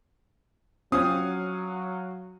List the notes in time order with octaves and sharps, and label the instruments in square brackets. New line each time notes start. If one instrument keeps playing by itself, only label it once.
[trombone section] F#3 [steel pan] C4 C#4 F4 [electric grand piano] F5 F#5 G#5 [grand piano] D#6